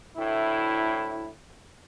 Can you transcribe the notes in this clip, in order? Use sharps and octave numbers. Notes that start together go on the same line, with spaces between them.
D2 A2 E4